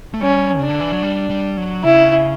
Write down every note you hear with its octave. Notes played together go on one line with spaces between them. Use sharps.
A3
G3 C#4
C#3 D4
D3
E3
F#3
G3
G3
F#3
C#3 E4